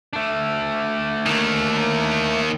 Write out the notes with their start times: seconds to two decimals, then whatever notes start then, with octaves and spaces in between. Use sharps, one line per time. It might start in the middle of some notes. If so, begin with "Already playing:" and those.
0.13 A3 D4
1.26 D#2 D#3